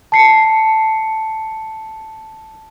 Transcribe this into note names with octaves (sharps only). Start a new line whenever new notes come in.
A5 C7 C#7